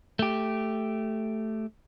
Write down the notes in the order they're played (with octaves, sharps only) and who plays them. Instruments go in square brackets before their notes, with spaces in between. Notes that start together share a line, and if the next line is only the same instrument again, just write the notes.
[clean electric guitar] A3 G4